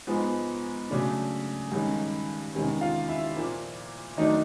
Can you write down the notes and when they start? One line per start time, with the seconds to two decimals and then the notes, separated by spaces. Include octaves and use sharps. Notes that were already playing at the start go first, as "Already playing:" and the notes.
0.07 G#2 F3 G#3 B3
0.90 C#3 F#3 A3 D4
1.72 G2 D#3 G#3 C#4
2.54 E2 C3 D#3 G#3 C#4
2.81 F4 F5
3.08 E4 E5
3.36 A#2 F3 A#3
4.17 D#3 F#3 A3 D4 D#4 D#5